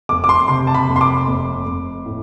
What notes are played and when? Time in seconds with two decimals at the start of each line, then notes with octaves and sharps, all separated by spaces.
0.09 F1 D6
0.24 D6
0.29 C6
0.48 C3 C6
0.67 A5
0.75 B5
0.88 F1
0.96 C6
1.01 D6
1.27 F1
1.66 F1
2.06 A2